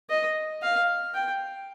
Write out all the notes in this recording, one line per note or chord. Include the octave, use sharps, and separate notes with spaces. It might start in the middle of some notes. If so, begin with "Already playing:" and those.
D#5
F5
G5